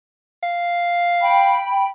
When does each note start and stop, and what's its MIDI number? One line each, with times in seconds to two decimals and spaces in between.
0.43 1.61 77
1.21 1.88 79
1.21 1.88 83